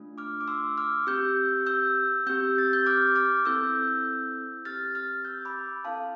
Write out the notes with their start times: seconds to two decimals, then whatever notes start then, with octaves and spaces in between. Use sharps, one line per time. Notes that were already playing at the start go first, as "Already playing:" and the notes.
Already playing: A3 D4 F4
0.18 D6 F6
0.41 D6
0.48 C6 E6
0.78 D6 F6
1.07 C4 G4 E6 G6
1.66 E6 G6
2.26 C4 G4 E6 G6
2.58 A6
2.73 G6
2.86 D6 F6
3.16 D6 F6
3.45 C4 E4 A4 E6 G6
4.65 C4 G4 F6 A6
4.95 F6 A6
5.25 E6 G6
5.45 B5 D6
5.85 C4 E4 A4 F5 A5